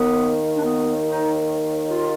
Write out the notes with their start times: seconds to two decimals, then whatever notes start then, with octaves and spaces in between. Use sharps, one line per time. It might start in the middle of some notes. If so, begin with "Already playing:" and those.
Already playing: D#2 D#3 B3
0.56 D4
0.62 B3
1.05 D#4
1.90 F4